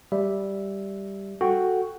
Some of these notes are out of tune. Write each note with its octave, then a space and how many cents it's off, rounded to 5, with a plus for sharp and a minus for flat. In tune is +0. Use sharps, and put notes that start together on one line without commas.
G3 +0 E5 +0
F#4 +0 A4 +0 G5 +0